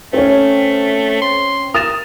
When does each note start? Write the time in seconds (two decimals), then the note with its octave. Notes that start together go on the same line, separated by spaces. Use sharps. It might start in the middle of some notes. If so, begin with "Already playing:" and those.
0.13 A3 C4 C#4
1.22 C6
1.74 A#4 D#6 A6 E7